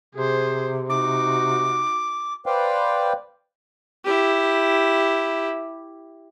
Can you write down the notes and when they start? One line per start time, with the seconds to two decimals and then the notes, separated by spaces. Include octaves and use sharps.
0.15 C3 G#4 C5
0.89 D#4 F#4 D6
2.46 B4 C5 D5 F5 G5
4.05 E4 G4